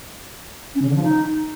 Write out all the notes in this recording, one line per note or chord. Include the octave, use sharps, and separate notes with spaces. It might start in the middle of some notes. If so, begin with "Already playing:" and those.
C#4
C#3
D3
F3
D#4